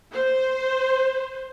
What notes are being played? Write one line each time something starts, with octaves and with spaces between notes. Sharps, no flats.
C5